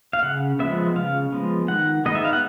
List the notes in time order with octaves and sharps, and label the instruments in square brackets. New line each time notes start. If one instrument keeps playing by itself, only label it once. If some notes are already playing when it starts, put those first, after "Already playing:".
[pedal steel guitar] F5
C#3 F#5
F3 G#3 B3 E5
C#3 F5
F3 G#3 B3
D#3 F#5
G#3 B3 D#4 D#5
E5
F5
F#5